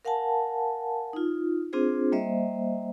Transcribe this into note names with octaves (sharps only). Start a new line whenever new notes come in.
A#4 F5 F#5 G#5 A5
D#4 F4
C4 D4 F4 G#4 C5
G3 A#3 C5 D#5 E5